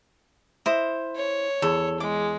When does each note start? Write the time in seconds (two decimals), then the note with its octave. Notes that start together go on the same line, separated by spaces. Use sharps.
0.66 E4 C5 D#5
1.16 C#5
1.62 E2 A4
2.00 G#3 D6